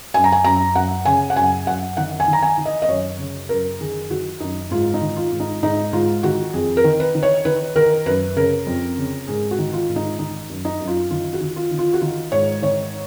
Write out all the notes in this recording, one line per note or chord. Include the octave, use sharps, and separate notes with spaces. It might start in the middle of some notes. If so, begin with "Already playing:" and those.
F#2 G#5
A#5
G#5
F#2 A#5
F#2 F#5
C#3 G#5
F#5
F#2 G#5
F#2 F#5
D#3 F#5
G#5
D#3
A#5
G#5
D#3
D#5
D#5
F#2 C#5
C#3
F#2 A#4
D#3 G#4
D#3 F#4
F#2 D#4
G#2 F4
D#4
D#3
F4
G#2
D#4
G#2 D#4
G#2 F4
D#3 F#4
F2 G#4
A#4
D#3
B4
D#3
C#5
D#3 B4
D#3 A#4
F#2 B4
C#3 A#4
F2
C#3
G#2 G#4
F#4
D#3
F4
G#2
D#4
D#3 D#4
F#2
D#4
F#2
F4
D#3 F4
F#4
D#3
F4
D#3
F4
F#4
D#3 F4
G#2 C#5
D#3 C#5